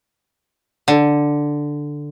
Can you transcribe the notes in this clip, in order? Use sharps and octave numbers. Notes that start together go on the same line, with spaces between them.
D3